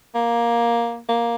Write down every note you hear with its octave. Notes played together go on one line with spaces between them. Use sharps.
A#3
A#3